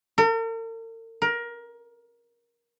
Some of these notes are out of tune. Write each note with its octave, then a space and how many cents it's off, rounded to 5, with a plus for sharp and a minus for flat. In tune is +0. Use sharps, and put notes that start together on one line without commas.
A#4 -45
A#4 +20